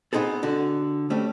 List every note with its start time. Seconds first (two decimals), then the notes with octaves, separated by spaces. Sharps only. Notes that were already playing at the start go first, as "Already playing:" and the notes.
0.13 B3 C4 D#4 G#4 A4
0.43 D3 F#4
1.10 G3 A3 C4 C#4